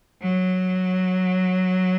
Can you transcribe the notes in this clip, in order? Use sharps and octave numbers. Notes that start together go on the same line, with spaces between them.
F#3